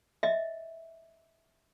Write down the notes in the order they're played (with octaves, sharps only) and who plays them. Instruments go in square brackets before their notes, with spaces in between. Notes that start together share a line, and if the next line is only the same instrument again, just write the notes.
[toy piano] D#5 E5